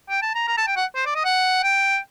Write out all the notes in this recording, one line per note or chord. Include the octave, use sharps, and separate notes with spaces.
G5
A5
A#5
A#5
A5
G5
F#5
C5
D5
D#5
F#5
G5